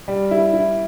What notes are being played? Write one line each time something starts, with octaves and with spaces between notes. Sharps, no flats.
G3
E4
E4